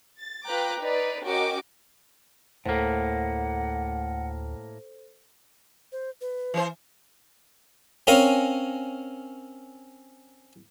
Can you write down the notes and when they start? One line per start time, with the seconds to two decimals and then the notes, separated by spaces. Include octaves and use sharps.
0.16 A6
0.45 F4 B4 G5 A#5 D6 F#6
0.78 D#4 B4 D5
1.25 C#4 F#4 A#4 D#5 G5 D6
2.66 D2 A2 A#3 A4 C5 F#5
5.92 C5
6.21 B4
6.54 E3 C5
8.07 C4 C#4 A#4 C#5 F5 G#5